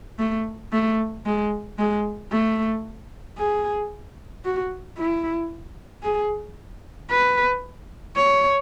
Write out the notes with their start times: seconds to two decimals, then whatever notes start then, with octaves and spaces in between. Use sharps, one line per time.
0.18 A3
0.72 A3
1.25 G#3
1.78 G#3
2.31 A3
3.37 G#4
4.44 F#4
4.97 E4
6.03 G#4
7.10 B4
8.16 C#5